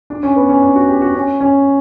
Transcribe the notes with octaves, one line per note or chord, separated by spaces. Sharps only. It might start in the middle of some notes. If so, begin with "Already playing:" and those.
D4
C#4
B3
C#4
D4
F#4
G4
F#4
C#4
C#4